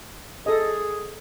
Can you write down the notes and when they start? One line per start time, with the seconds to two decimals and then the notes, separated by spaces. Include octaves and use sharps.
0.46 G#4 A4 D#5